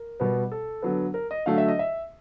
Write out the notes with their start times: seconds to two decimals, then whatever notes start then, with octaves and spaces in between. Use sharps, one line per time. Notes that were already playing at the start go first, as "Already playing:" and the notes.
Already playing: A#4
0.20 B2 G3 B3
0.52 A4
0.82 D3 F#3 B3
1.14 A#4
1.31 D#5
1.46 D3 F#3 A3 F5
1.58 E5
1.68 D#5
1.79 E5